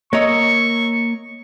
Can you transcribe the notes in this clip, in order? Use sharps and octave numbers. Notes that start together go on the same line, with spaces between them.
A#3 C#5 D#5 A#5 C#6 E6